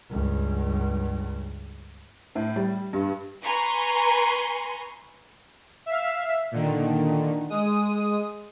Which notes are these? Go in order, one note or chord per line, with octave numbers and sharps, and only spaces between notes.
C#2 G2
A2
G3
G2
B4 G#5 A#5 C6 C#6
E5 F5
A#2 D3 D#3
G#3 D#6